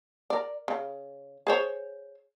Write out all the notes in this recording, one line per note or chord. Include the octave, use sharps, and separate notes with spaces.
A#4 D5
C#3
G#4 C5 C#5